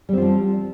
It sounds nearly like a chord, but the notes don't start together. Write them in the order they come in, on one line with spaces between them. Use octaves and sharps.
G3 C4 F4 F3